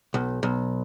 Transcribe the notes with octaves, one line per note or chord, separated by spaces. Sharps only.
B1
B1